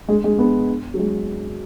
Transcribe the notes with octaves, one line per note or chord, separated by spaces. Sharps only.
G#3
G#3
B3
F#3
G#3